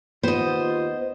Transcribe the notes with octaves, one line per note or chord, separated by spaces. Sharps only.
D#2 B3 F4 C5 D#5